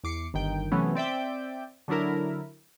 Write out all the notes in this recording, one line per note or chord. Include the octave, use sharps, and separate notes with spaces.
E2 D6 C7 C#7
G1 D#3 G5
C3 E3 F#3 A3 B3 C#4
C4 D5 E5 G5
D3 F#3 D4 E4 A#4